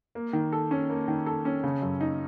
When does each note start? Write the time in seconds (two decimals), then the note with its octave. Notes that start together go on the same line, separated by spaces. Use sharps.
0.15 A#3
0.33 D#3
0.53 A4
0.71 C#4
0.90 A#3
1.08 D#3
1.26 A4
1.45 C#4
1.64 C#3
1.82 F#2
2.01 D#4